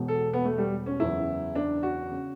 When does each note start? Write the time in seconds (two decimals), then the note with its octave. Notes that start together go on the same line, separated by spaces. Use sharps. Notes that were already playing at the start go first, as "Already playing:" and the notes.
Already playing: E1 E2 B2
0.08 A4
0.33 B3
0.45 A3
0.58 G3
0.86 C#4
1.00 F#1 E2 C#3 E3 E4
1.55 D4
1.83 F#4
2.11 C#3